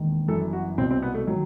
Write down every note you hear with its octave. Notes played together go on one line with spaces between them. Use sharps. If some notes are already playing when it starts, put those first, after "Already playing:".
Already playing: E1 D#2 D#3
G1 F#2 E3 A4
F#4
C2 B2 C4
C4
B3
A3
D#3 F#3